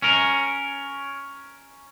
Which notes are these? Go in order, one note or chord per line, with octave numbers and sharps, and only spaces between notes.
C#4 A#4